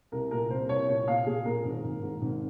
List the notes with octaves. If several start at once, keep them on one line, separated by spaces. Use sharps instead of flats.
C2 A#4
A#2 A#4
C2 C5
C2 C#5
A#2 C#5
A#2 F5
A#2 G#4
A#2 A#4
G#1
G#1
G#2
G#1